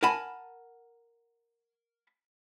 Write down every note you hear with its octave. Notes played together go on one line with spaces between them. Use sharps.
A#4 F#5 G#5 A5 B5